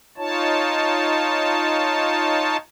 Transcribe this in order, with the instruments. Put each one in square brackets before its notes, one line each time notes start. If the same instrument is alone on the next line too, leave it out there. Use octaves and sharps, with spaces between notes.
[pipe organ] D#4 F4 C#5 A5